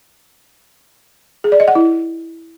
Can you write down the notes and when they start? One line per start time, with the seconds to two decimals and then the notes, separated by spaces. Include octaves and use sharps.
1.44 G#4
1.52 D5
1.60 D#5
1.68 F#5
1.75 E4